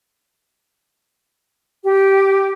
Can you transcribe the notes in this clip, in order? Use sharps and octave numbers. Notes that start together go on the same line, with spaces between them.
G4